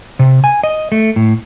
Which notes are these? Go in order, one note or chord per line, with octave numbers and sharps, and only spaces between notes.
C3
G#5
D#5
A3
A2